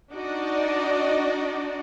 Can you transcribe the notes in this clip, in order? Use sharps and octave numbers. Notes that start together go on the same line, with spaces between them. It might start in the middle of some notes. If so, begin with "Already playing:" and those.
D4 D#4 F#4 D5 D#5